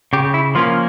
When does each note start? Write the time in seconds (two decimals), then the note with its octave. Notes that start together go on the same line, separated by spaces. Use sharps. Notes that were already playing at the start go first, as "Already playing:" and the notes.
0.13 C#3 G4
0.34 E4
0.55 F3 A#3 C#4 F4